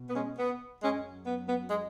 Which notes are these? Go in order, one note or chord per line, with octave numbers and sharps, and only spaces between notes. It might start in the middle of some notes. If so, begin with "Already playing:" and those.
Already playing: B2
B3
G#3 C#4
B3
F#2 F#3 G#3 C#4
B3
B3
G#3